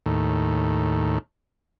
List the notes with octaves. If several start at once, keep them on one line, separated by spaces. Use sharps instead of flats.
D#2 A2